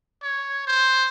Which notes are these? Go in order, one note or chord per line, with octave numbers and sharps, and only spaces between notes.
C#5
C5